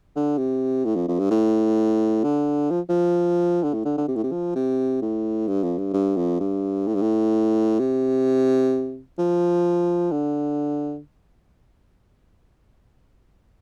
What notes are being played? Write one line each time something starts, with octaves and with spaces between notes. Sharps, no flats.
D3
C3
A2
F2
F2
G2
A2
D3
F3
F3
D3
A2
D3
D3
C3
A2
C3
F3
C3
A2
G2
F2
G2
G2
F2
G2
A2
G2
A2
C3
F3
D3